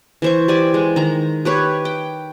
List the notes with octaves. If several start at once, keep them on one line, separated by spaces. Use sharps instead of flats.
E3 C5 C#6
G4 D5 G#5
G#3
D#3 A#5
G4 B4 C#5
G5